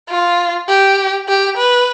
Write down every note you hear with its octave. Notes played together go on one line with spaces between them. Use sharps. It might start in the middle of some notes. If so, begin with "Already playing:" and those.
F4
G4
G4
B4